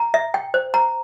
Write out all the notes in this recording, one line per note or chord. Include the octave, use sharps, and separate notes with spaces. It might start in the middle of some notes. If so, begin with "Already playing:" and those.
Already playing: A#5
E5
G5
C5
A#5